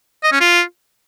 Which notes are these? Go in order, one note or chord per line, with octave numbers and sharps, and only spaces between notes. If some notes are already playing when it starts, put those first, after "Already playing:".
D#5
C#4
F4